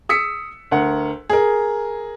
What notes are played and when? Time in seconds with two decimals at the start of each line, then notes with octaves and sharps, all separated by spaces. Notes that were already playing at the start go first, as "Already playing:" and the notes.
0.09 D#6 E6 B6 C#7
0.71 D2 A#4 F#5
1.30 G#4 A#4